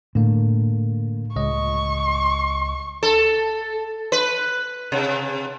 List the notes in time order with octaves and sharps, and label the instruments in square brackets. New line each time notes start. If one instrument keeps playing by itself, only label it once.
[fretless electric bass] A2 [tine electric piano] D3 A#3
[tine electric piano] C#2 D#5 [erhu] C#6
[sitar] A4
B4
C3